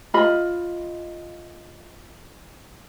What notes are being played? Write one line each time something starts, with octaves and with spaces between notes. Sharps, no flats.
F4 D#5 B5